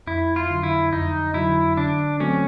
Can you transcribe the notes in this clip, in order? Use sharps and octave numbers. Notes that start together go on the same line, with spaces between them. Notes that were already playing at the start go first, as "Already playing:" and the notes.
F2 E4
F4
D3 F#3
E4
F2 D#4
D3 F#3 E4
D3 D4
F#3 A3 C4 C#4